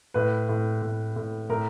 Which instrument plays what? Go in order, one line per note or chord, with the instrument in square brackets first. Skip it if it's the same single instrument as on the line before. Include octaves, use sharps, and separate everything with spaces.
[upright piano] A2 B4
A2
A2
A2
A2 A#4